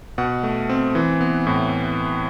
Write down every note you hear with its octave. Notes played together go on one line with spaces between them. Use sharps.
B2 F#5
A3
C4
E3
B3
A2